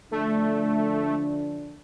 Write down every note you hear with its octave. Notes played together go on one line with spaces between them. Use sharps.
D3 F3 A3 D4